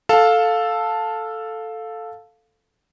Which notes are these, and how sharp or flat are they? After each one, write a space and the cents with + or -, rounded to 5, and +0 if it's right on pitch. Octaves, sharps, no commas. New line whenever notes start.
A4 +0 F5 +10 A5 +0